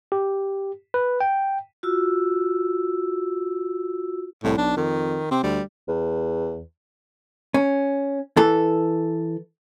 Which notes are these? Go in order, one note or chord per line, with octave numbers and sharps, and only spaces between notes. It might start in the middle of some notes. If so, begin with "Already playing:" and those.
G4
B4
G5
F4 F#4 E6
C2 A2
B1 D4
F2 D#3
C3 C4
D2 G3
E2
C#4
E3 A4